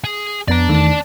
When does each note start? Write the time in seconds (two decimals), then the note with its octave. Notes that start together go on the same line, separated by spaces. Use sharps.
0.04 G#4
0.48 F2 B3 D5 A5 A#5
0.68 E2 D#3 A3